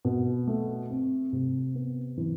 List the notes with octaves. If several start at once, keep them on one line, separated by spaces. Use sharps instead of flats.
B2
A3
C4
C3
B3
E3